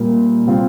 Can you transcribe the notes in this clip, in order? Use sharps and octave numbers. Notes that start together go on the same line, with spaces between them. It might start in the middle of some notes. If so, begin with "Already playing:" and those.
Already playing: A#2 G3 A#3
C3 G3 C4 F4